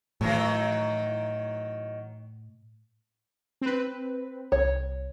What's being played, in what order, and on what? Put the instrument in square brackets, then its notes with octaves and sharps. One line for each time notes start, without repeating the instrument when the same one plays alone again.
[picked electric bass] A2 [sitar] D#3 E3 F#3
[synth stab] C4 B4
[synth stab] C2 [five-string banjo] C#5